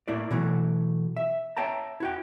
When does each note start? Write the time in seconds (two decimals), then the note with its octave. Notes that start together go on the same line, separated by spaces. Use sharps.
0.08 A2 A#3 E4 D5
0.31 B2 E3 F#3 A3
1.17 E5
1.57 C#5 E5 G5 A5 A#5
2.00 E4 F#4 G5